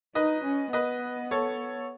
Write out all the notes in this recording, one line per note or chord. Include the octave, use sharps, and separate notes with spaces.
D#4 B4 D#5
C#4
B3 B4 D#5
A4 C#5